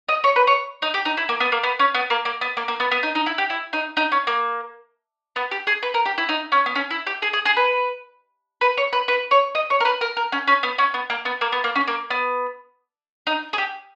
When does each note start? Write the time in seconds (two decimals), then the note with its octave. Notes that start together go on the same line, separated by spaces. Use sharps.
0.09 D#5
0.24 C#5
0.36 B4
0.47 C#5
0.82 D#4
0.94 G4
1.05 D#4
1.17 E4
1.29 A#3
1.40 B3
1.52 A#3
1.63 B3
1.79 C#4
1.94 B3
2.10 A#3
2.25 A#3
2.41 B3
2.57 A#3
2.68 A#3
2.80 B3
2.91 B3
3.03 D#4
3.15 D#4
3.26 E4
3.38 G4
3.50 E4
3.73 D#4
3.97 D#4
4.12 C#4
4.27 A#3
5.36 B3
5.51 G4
5.67 G#4
5.83 B4
5.94 A#4
6.05 G4
6.18 E4
6.29 D#4
6.52 C#4
6.66 B3
6.75 C#4
6.91 E4
7.07 G4
7.22 G#4
7.33 G#4
7.45 G#4
7.57 B4
8.61 B4
8.77 C#5
8.93 B4
9.08 B4
9.31 C#5
9.55 D#5
9.70 C#5
9.80 A#4
9.85 B4
10.01 A#4
10.17 A#4
10.32 C#4
10.48 C#4
10.63 B3
10.78 C#4
10.94 B3
11.10 A#3
11.25 B3
11.41 A#3
11.52 B3
11.64 A#3
11.75 C#4
11.88 A#3
12.10 B3
13.27 D#4
13.53 G#4
13.58 G4